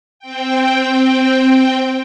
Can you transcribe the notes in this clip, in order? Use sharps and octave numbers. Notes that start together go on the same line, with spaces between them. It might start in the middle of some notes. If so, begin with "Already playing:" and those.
C4 G5